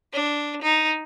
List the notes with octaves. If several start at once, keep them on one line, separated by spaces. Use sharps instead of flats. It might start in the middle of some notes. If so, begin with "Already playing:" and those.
D4
D#4